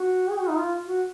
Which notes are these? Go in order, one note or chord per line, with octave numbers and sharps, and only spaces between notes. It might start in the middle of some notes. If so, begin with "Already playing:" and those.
Already playing: F#4
G#4
F#4
D#4
F4
F#4